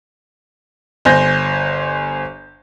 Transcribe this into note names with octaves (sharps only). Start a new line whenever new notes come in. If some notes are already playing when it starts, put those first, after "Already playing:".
G1 C5 G#5 G6 A#6